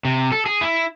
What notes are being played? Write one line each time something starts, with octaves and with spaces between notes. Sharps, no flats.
C3
A4
G#4
E4